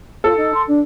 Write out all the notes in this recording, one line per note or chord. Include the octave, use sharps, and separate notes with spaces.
F4 A4
D#4
C6
D4